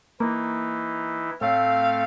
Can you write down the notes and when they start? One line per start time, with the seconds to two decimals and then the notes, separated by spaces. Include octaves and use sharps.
0.20 E3 A#3 D#4 E4
1.41 A2 A3 C4 A4 F5